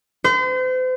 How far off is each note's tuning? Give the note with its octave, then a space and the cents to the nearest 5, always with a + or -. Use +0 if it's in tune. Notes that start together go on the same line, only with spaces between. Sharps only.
C5 -40